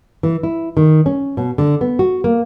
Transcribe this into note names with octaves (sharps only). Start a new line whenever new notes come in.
E3
E4
D#3
C#4
B2
D3
B3
F#4
A#3